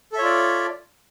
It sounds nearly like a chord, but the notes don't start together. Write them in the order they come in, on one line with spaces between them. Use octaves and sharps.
A4 E5 C#5 F4 D5